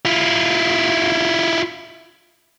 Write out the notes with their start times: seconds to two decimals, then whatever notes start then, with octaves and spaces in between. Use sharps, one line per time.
0.05 E4 F4